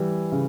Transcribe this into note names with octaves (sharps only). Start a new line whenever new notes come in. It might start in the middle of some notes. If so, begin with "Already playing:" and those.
Already playing: E3 G3
C#3